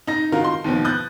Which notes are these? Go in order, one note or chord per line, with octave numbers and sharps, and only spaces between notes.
D#4 A#6
D#3 D#4 F4 F#4 A#4
C6
D#2 B2 F3
D#6 F#6 G6 A6